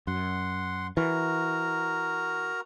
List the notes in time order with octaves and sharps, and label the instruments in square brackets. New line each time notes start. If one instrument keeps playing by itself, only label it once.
[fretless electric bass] F#2 [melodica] F#5 C6
[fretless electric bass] E3 [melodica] F#4 A#4 A#5